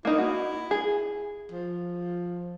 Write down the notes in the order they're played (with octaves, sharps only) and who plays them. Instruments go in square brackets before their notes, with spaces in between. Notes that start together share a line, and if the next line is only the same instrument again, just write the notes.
[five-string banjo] A#3 D#4 [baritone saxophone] E4
[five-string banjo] F#4
G#4
[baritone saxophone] F3